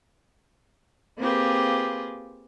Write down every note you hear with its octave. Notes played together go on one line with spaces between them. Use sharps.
A#3 C4 F4 G4 G#4 B4